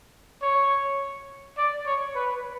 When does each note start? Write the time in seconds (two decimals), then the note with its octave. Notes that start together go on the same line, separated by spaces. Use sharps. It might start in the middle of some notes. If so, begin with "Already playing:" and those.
0.42 C#5
1.57 D5
1.86 C#5
2.15 B4